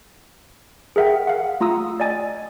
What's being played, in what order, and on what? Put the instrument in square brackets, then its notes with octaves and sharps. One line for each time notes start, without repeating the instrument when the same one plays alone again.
[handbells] G#4 A#4 E5 F#5 G5
F5 F#5
A3 F4 A#5 D#6 E6
D5 D#5 G#5 A6